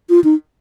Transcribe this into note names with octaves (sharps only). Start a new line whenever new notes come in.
F4
D#4